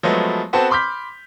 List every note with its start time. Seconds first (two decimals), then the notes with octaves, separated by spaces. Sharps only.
0.03 F3 F#3 G#3 A3 B3
0.53 B3 C4 F#4 A4 C5 A5
0.70 B5 C6 D6 F6 G6 B6